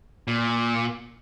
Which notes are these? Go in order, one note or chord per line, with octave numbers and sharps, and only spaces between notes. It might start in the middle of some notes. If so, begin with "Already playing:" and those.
A#2